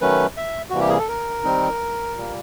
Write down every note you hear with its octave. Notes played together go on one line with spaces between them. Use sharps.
D#3 F#3 A3 C#4 B4
E5
C3 E3 G3 A#3 F#4
G4
G#4
A4
A#4
D#3 G3 C4 D#4
A#2 G3 A#3